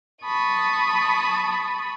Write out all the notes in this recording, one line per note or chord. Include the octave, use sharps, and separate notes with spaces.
A5 B5 C#6 D#6